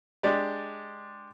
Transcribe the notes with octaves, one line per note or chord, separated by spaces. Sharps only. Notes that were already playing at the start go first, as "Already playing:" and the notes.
G#3 D4 G4 D5